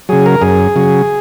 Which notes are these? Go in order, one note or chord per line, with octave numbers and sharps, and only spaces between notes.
C#3 F#3 G#4
A#4
F#2 G#4
C#3 F#3